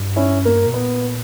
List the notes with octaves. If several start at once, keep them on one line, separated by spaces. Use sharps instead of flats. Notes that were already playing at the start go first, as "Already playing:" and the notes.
Already playing: G2
C#4 E4
A#3
B2
A#2 B3